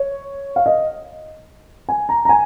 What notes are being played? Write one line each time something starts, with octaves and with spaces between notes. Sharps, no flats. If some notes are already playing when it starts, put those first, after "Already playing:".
Already playing: C#5
F5
D#5
G#5
A#5
A#5
G#5